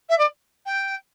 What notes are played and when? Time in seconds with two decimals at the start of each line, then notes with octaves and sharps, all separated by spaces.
0.09 E5
0.18 D5
0.66 G5